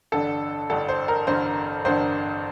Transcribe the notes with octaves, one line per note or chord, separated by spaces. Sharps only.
A1 G2 D3 A4
A1 G2 D3 A4
C5
A#4
A1 G2 D3 C5
A1 G2 D3 C5